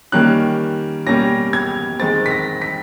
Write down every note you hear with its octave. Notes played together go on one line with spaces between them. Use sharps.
D#3 G3 A#3 C#4 F#6
B2 G3 A#3 C#4 A#6
G#6
D#3 G#3 C4 A6
B6
A#6
B6